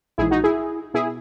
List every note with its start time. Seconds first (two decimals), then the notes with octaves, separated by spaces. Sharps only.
0.18 A#1 G#2 E3 E4 G#4
0.31 D#4 F#4
0.44 E4 G#4
0.94 B2 E4 G#4